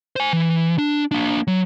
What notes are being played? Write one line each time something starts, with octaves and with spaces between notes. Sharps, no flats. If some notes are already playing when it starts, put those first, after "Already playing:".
C5 G#5
E3
D4
A#3 D4
F#3